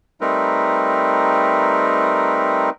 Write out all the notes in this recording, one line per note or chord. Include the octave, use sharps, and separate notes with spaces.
G3 A3 C4 D#4 A#4 B4